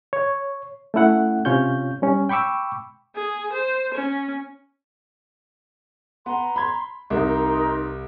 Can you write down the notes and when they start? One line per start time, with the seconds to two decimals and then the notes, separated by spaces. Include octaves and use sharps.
0.13 C#5
0.94 A3 C#4 E4 F#5
1.45 C3 C#4 F4 C#5 G6
2.02 G3 C#4
2.29 G5 B5 C#6 D6 E6
3.15 G#4
3.53 C5
3.94 C#4
6.26 B3 A#5 C6
6.56 B5 G#6
7.10 C2 D#4 A#4 C6